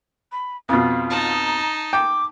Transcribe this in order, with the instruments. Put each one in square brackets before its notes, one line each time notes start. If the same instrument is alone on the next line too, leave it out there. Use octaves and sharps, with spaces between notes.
[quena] B5
[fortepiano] F2 B2 [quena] F4
[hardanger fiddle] D#4 A5
[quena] A#5
[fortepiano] G5 [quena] D6